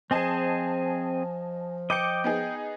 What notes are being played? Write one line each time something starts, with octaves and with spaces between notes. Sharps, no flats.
F3 C4 G#4 D#5 G#5 A5
D#5 G5 D6 C#7
B3 D#4 G#4